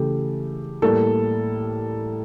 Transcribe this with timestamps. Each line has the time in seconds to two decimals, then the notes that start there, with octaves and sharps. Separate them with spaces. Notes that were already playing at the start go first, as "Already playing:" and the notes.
Already playing: C#3 E3 A3 G4 A4
0.82 A2 G3 A#3 A4